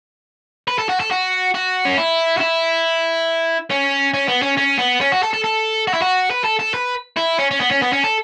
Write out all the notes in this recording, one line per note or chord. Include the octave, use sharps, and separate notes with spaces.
B4
A4
F#4
A4
F#4
F#4
C#4
E4
F#4
E4
C#4
C#4
B3
C#4
C#4
B3
C#4
F#4
A4
A4
A4
F#4
E4
F#4
B4
A4
A4
B4
E4
C#4
C#4
B3
C#4
B3
C#4
A4